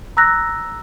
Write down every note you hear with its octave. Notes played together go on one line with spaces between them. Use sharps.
A#5 E6 F#6 A#6